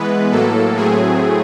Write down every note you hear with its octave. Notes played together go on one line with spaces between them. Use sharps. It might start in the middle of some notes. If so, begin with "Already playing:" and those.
Already playing: E3 G#3 B3 B4
A2 F#3 A#3 A4
A2 F#3 A3 C4 G#4